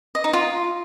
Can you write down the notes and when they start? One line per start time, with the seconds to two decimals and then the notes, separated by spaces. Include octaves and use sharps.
0.15 D#5
0.24 D#4
0.33 F4